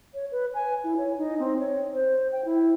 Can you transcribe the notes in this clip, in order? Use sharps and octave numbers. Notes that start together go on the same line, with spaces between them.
C#5
B4
G#5
E4
C#5
D#4
C4
C#5
C5
G5
E4